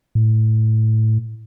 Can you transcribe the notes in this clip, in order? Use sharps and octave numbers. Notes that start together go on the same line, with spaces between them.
A2